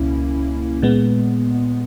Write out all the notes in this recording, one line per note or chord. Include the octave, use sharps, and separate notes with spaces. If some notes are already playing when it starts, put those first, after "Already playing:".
Already playing: C#2 B2 A#3 C#4 E4
A#2 G#3 B3